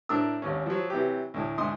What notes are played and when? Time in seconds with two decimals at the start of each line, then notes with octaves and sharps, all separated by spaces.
0.09 A2 D4 A#4 E6
0.42 G#1 D#2 C#4
0.66 F3 F#3
0.90 C3 E3 F#3 G4
1.34 D2 A2
1.58 D2 G#2 E4 C6 D#6